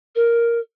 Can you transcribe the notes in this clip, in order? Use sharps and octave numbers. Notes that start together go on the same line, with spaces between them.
A#4